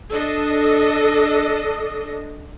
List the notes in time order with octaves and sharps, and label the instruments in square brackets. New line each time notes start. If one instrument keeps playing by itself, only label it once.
[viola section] D4 A4 D#5